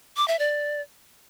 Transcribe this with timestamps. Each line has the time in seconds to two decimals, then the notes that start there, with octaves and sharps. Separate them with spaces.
0.17 D6
0.28 E5
0.39 D5